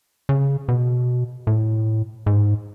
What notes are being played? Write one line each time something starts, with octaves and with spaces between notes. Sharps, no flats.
C#3
B2
A2
G#2